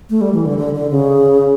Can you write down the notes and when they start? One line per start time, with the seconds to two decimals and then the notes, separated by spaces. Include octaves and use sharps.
0.10 A3
0.21 G3
0.34 E3
0.46 D3
0.58 D3
0.75 D3
0.90 C#3